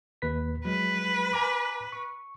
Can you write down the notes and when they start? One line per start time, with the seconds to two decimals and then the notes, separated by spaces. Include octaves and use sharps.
0.22 D#2 B4 B6
0.65 F#3 G#3 B4
1.33 G#5 A#5 D6
1.92 C#6